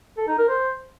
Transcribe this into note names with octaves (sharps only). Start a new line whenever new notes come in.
A4
D#4
A#4
C5